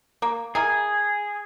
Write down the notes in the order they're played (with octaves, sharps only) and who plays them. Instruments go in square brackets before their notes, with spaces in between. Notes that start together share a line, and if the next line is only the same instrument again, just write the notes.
[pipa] A#3
[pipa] E4 A#4 G#5 [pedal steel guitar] G#4